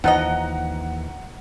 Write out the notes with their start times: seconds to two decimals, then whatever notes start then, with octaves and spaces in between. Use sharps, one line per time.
0.04 D#2 E3 F3 D#4 D#5 F#5 A#5